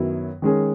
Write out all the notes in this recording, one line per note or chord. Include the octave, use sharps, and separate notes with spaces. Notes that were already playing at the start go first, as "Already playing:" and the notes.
Already playing: F#2 D#3 F#3 B3 E4
D#3 G#3 C#4 G#4